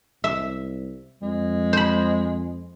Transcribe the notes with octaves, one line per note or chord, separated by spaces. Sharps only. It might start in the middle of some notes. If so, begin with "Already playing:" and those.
C2 E5
F2 G#3
C5 B5